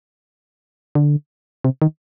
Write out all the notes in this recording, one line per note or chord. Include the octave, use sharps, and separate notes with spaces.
D3
C3
D#3